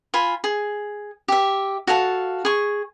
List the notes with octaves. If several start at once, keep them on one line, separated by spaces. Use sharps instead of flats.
F4 G#5 B5
G#4
G4 E5
F#4 A4 F5 A5
G#4 C#6